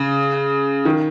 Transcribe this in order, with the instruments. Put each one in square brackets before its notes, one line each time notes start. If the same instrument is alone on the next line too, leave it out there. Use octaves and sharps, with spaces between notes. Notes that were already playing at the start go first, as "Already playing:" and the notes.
Already playing: [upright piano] C#3
D#3